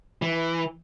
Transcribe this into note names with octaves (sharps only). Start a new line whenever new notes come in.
E3